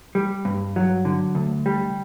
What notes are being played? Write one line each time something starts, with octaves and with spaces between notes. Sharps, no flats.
G3
G2
F#3
D3
D2
G3